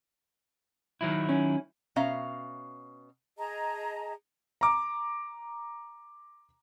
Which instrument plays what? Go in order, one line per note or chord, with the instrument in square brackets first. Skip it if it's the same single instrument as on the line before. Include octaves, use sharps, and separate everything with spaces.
[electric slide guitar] D#3 F#3 E4
[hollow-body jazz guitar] C#4
[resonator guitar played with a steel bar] B2 C#4 E5 F5 A#5
[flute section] G#4 D#5 A5 A#5
[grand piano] A#5 D6